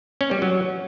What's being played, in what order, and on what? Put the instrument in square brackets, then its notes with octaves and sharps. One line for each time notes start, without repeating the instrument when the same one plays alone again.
[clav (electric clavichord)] C#4
G3
F#3